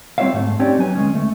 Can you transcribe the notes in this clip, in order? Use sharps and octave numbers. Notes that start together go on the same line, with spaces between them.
G3 C4 F4 C#5 E5 F5
G#2 A3
C4 C#4 D#4 G4 C#5 D5
F#3 B3 G#5
D2 G#3 C#4
A3